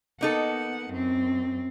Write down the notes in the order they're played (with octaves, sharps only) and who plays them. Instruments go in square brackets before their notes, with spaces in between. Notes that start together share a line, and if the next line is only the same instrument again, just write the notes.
[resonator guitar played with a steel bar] A#3 D#4 A4 [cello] B3 F#5
[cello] F#2 C4